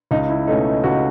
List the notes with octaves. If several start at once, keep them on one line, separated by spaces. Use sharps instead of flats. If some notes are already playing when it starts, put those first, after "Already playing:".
C#2 D#4
E4
B2 A3 C#4 D#4
C#2 F#4